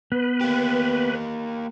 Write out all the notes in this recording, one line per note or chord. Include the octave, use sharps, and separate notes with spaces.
B3 B4
A#3 G4